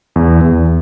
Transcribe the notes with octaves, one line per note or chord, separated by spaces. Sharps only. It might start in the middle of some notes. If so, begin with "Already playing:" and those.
E2
E2